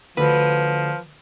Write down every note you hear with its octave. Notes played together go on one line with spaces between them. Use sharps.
D2 F3 B4